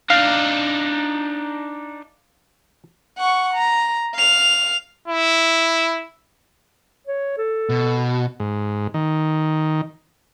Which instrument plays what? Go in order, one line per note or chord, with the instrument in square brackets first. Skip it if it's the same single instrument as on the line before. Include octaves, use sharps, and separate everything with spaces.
[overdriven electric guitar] D4 D#4 [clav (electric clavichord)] F5
[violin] F#5 C#6
A#5
F5 F7
[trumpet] E4
[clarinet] C#5
A4
[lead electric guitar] B2
[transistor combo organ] G#2
D#3